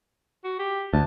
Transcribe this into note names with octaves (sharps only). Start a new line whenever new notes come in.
F#4
G4
D2 A5